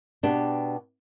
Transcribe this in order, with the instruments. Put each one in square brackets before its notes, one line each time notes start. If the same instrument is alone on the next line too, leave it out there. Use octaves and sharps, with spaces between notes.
[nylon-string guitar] B2 B3 D4 G4